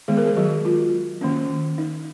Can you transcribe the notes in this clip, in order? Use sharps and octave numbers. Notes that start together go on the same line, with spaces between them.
D#3 G#3 B3 G#4
A#4
G#3 G#4
F#3 F#4
F4
D#3 A#3 C#4
D#4